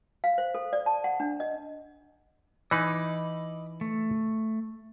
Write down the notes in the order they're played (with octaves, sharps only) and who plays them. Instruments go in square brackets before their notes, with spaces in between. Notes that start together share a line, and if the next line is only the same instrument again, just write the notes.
[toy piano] F5
C5
A4
D5
A5
F#5
D4
D#5
[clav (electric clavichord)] E3 D#4 [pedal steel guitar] D#5 B5 D6
[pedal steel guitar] A3